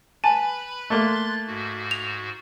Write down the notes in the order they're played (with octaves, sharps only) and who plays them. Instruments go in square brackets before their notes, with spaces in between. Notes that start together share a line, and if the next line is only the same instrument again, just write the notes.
[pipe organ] B4 B5 [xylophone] G#5 [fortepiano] A5
[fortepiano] A3 A#3 [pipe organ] C6 F#6 A6
[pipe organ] G#2 F#4
[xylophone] F7